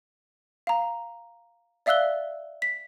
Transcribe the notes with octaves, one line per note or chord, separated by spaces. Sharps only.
F5 A#5
D5 E5 F5 E6 F#6 G7
B6